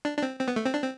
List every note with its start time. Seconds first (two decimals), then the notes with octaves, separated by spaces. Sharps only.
0.05 D4
0.18 D4
0.22 C4
0.40 C4
0.48 B3
0.56 A3
0.66 C4
0.74 D4
0.82 C4